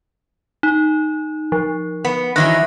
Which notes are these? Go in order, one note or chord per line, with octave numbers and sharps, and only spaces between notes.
D#4
F3
B3
D#3 E3 F#3 F#6 A#6